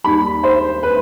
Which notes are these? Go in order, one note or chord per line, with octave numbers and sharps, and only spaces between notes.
D#2 D#3 G3 B5
C5
B4